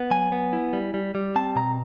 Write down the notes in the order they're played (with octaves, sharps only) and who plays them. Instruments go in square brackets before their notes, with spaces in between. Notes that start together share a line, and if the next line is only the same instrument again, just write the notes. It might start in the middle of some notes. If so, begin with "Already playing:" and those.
Already playing: [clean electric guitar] B3
F#3 G#5
B3
E4
G3
G3
G3
C4 A5
B2 A#5